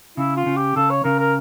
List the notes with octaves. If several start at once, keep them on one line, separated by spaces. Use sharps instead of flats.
C#3 E4
F4
C#3
G4
C#3 A4
C#5
C#3 A#4
A#4